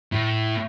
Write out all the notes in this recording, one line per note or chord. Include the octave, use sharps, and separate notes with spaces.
A2